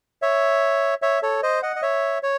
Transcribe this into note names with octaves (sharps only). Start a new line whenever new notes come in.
C#5 E5
C#5 E5
A4 C#5
C5 D#5
D#5 F#5
D#5
C#5 E5
C#5